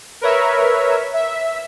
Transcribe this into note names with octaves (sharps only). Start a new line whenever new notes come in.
A#4 B4 C#5 E5
E5